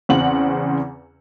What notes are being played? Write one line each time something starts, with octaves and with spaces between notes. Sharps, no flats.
E2 C#3 C4 F#5 F#7